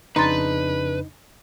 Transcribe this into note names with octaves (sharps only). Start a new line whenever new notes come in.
F2 C#3 D4 D#4 B4 A#5 C6 A6